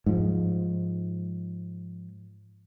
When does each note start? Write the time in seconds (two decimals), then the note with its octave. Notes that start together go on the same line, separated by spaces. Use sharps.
0.06 G#2 F3